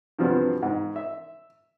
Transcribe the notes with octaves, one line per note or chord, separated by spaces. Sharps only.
G2 C3 F3 F#3 B3
G#2
E5